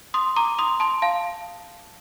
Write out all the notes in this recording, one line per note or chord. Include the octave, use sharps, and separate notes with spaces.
C6 D#6
A#5 D6
C6 D#6
A5 C6
F5 A5